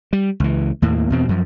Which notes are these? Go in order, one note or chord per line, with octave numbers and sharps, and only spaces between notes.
G3
C#2 E3
D#2 A2 A#3
E2 B2 C4
F#2 F3